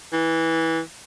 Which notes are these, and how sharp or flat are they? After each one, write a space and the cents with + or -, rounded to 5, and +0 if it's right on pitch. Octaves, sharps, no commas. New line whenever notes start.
E3 -15